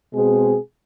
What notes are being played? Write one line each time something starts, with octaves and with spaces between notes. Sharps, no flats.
B2 G#3 C4 G#4